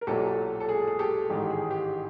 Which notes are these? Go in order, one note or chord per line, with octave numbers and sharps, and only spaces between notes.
A#4
B1 A#2 F#3 G4 A4
A4
G#4
G#4
G4 A4
A1 G#2 D#3 G4
G#4
G4